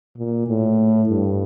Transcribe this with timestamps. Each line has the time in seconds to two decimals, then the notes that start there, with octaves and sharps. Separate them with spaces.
0.17 A#2
0.48 A2
1.09 G2